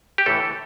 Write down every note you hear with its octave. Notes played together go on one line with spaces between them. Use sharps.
G4
A2 E3 A4